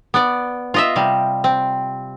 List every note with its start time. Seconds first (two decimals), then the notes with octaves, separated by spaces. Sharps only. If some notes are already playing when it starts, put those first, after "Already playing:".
0.14 B3 D5
0.74 F4 D#5 E5
0.96 C3 G3
1.44 C4